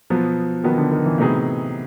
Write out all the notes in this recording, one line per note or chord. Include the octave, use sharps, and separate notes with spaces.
B2 F3 F#3 B3
B2 D#3 F#3 B3
D3
D#3
E3
A2 C3 F#3 B3 D#4 G#4